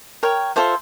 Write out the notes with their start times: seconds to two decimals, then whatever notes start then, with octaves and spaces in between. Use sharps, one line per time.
0.23 A#4 C#5 G5
0.56 F4 A4 C5 E5